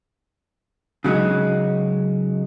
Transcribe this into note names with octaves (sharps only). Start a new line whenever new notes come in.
C#3 F#3 G#3 D#4 F#4